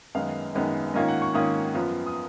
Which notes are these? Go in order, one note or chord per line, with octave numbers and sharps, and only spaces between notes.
F#2 D#3 G#3 B3 D#4 F5
F#2 D#3 G#3 B3 D#4
G#2 D#3 A#3 C#4 F4 D#5
F#5
C#6
G#2 D#3 A#3 C#4 F4 D#6
F#2 F3 B3 F4
D#6